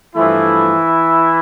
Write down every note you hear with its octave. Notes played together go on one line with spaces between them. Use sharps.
G2 E3 F3 A3 E4